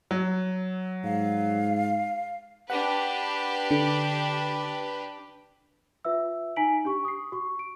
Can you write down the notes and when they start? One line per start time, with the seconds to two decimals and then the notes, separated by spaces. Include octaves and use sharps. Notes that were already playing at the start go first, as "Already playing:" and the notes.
0.11 F#3
1.04 G#2 F5
2.70 D4 G4 B4 F#5
3.71 D3
6.05 F4 B4 E5 E6
6.56 D#4 G#5 A#5 B6 D7 F#7
6.85 D4 G4 C#6
7.05 D#6 C7
7.32 F#4 C#6
7.59 D7